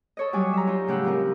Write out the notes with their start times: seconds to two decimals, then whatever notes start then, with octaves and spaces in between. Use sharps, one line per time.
0.17 A4 C#5 D#5
0.33 F#3 G3 F#4 G#5 D6 D#6
0.53 E5 A#5
0.67 D#4 F4 C5 C#5
0.87 A2 C#3 G4 F#5 E6
1.05 F3 C4 A#4 D#5